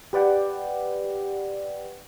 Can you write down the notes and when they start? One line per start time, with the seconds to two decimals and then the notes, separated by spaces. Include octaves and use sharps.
0.13 G4 B4 D5 F#5 G5